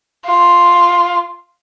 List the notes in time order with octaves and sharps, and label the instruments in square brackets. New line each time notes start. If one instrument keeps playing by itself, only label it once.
[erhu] F4